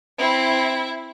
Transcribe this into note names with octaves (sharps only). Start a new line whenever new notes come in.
C4 E4